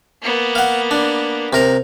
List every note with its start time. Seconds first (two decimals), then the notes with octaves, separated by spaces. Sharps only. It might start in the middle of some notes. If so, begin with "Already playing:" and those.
0.22 A#3 B3
0.55 F5 F#5
0.91 D4
1.53 C3 A#4 A#5